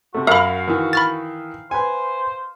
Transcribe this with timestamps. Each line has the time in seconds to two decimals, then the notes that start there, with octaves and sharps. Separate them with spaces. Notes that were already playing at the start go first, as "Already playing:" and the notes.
0.14 C3 A3 F#4
0.27 F#2 A#4 E5 F5 B5
0.68 D#3 E3
0.93 B5 F6 A6
1.71 B4 C5 G#5